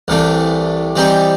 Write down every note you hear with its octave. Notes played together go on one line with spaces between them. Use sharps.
C2 C3 E3 A3 D4
E3 G3 C4 D#4 G4